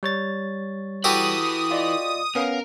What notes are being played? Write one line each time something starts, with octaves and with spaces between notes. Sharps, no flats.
G3 C#5 A6
E4 F#4 G4 A4 B4 D#6
F4 D5 D#5
B3 C#4 A#4 F5 A#5